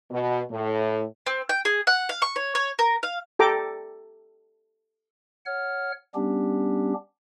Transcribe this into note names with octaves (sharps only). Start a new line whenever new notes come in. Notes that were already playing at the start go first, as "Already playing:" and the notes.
B2
A2
C4
G5
G#4
F#5
F5
C#6
C#5
C#5
A#4
F5
G4 A4 G5 A#5 D6
C#5 F#5 F6
G3 B3 C#4 D4 G4